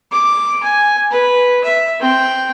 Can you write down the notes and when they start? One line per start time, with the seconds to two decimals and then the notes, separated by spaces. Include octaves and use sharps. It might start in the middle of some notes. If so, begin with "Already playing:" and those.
0.12 D6
0.63 G#5
1.11 B4
1.64 E5
2.00 C4 G5